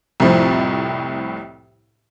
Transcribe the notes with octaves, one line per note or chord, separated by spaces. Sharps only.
C2 F2 A2 F3